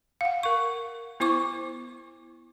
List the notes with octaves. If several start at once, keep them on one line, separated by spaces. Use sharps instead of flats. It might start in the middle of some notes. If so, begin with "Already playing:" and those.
F5 F#5
A#4 C#6
B3 E4 C5 C#6 D6